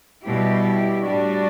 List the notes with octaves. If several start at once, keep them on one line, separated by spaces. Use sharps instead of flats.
B2 G3 E4 G4
A2 G3 D4 F#4